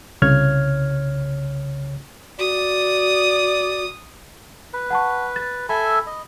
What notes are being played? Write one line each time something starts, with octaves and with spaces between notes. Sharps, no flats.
C2 C#3 C#5 F6 G#6
F#4 D5 D#6
B4
F#5 A5 C#6
A6
A4 E5 G#5 B5
D#5